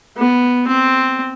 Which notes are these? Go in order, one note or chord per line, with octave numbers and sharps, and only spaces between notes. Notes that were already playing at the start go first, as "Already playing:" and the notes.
B3
C4